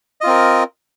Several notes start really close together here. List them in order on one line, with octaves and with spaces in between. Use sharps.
D#5 F4 C4 A#4